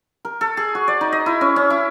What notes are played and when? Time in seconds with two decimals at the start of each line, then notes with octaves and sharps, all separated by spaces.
0.25 A#4
0.41 A4
0.57 G#4
0.75 F#4
0.88 D5
1.01 D#4
1.12 D#5
1.26 E4
1.41 C#4
1.56 C#4
1.70 E4